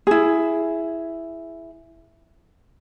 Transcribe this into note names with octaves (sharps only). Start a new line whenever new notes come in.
E4 G#4